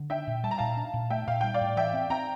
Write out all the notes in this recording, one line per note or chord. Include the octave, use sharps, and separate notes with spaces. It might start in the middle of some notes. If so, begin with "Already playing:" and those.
Already playing: D3
D4 E5 G5
A#2
G3 A5
A#5
A#2 F5 A5
D4
A#2
A3 E5 G5
A#2 F5
G3 G5
D5 F5
A2
E3 E5 G5
C4
C4 G5 A#5